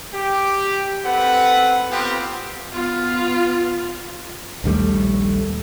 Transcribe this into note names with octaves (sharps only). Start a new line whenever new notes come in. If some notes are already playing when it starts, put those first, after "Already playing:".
G4
C4 A4 B4 F#5
B3 C4 F4 G4
B3 F4
A#1 D#2 G3 A3